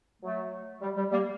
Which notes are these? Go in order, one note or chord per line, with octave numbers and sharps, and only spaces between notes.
F#3 A3
G3
G3
G3 A#3